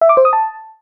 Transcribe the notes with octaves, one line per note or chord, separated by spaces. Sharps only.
E5
D6
C5
D#6
A5